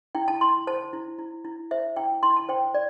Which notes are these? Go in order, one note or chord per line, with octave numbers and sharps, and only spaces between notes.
E4 G5
A5
E4 C6
C5 A5
E4
E4
E4
C5 E5
E4 G5
E4 C6
A5
C5 G5
D5